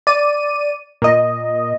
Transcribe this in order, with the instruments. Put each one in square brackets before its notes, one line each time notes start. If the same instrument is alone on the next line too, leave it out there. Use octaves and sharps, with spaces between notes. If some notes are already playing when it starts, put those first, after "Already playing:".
[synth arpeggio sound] D5 D#7
A#2 D#5